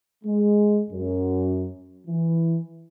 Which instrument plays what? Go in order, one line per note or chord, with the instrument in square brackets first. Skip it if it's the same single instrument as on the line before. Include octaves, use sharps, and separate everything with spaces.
[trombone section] G#3
F#2
E3